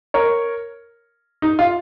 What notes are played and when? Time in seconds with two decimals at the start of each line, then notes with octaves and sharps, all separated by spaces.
0.14 A#4 C#5
1.42 D#4
1.59 F4